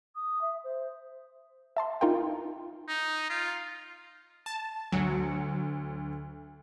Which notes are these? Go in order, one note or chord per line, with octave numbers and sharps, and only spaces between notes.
D#6
E5
C5
E5 A5 C6
D#4 F4 A#4 F5 G5
D#4
F4
A5
D2 F#3 C#7